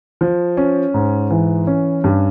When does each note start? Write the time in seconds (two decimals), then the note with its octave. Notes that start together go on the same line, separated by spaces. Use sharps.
0.21 F3
0.57 C#4
0.94 G#2
1.30 E3
1.67 C#4
2.04 G2